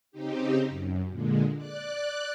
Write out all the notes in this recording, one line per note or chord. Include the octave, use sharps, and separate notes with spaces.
C#3 C4 D#4 G4
F#2
A#2 D3 G#3
D5 F#6